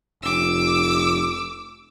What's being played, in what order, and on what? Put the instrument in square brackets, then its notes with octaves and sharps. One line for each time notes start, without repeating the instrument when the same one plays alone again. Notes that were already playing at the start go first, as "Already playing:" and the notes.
[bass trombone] F1 [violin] D6 E6